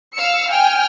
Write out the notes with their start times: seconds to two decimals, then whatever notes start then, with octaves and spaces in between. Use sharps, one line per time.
0.13 F5 E6 C#7
0.50 G5 G#5 F6